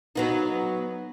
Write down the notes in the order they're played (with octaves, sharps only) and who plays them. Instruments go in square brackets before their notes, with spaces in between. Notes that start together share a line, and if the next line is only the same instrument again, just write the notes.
[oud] F#3 B3 D#4